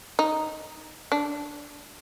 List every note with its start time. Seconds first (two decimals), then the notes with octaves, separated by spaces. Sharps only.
0.19 D#4
1.12 D4